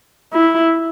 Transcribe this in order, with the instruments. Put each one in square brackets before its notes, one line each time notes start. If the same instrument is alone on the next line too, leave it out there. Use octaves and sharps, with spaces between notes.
[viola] E4